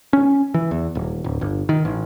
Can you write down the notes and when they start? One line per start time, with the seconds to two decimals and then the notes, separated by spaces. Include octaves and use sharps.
0.13 C#4
0.54 E3
0.71 E2
0.95 D#1
1.24 D1
1.41 G1
1.69 D#3
1.85 A1